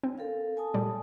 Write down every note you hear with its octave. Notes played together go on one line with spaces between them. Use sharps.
C4
A4 A#4 F5
G#5 A5 D#6
A#2 F#3 G3